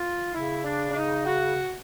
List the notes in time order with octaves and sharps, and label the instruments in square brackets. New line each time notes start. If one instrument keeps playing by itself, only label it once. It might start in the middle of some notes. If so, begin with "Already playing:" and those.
Already playing: [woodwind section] F4
[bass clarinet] C#3 [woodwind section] E4
[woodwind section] D4
D4
D#4
F#4